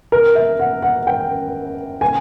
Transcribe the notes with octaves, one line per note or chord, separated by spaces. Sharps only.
A#4
E5
F#5
F#5
G5
G#5